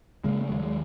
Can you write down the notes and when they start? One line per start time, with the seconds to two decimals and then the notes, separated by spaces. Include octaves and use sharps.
0.24 C#3 G#3 A#3
0.41 A3
0.49 D#2 F#3 G#3
0.62 G#3